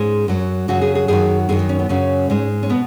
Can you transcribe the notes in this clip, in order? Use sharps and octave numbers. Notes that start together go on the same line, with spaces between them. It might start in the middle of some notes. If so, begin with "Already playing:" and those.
Already playing: G#2 G#3 C#4
F#2 F#3
F#2 C#3 F#3 F#4
G#4
G#4
F#2 D#3 F#3 G#4
F#2 D#3 F#3 G#4
D#4
C#4
B3
F#2 C#3 F#3 C#4
G#2 G#3
C#4
B2 B3